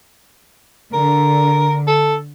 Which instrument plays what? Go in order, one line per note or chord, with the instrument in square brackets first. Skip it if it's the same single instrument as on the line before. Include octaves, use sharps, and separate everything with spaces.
[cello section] D3 [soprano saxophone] A#4
[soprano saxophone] A4